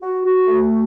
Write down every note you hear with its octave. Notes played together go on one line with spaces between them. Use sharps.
F#4
F#4
A3